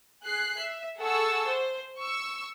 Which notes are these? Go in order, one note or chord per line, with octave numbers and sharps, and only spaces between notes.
G#4 F#6 C7
E5
G#4 A4 F#5 A5 C#6 E6
C5
C#6 E6